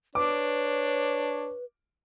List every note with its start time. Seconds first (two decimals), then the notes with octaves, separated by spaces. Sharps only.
0.15 D4 B4 C#5 D6